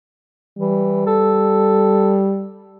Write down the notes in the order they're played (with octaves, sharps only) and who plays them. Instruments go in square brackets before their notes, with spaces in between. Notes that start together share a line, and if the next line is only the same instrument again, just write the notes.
[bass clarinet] E3 [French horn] G3
[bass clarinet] A4